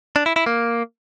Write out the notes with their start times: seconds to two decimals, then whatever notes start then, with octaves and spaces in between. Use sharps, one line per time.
0.16 D4
0.26 E4
0.36 E4
0.46 A#3